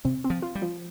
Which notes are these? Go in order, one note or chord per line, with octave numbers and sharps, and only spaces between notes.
C3 C4
C4
F3
F4
G3
F3